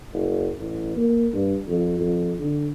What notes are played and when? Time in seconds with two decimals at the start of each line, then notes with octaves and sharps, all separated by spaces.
0.13 F#1
0.58 A1
0.96 A#3
1.34 G2
1.68 F2
2.00 F2
2.39 D3